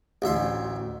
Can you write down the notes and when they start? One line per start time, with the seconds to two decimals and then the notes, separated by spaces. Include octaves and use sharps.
0.22 A1 D2 E5 C6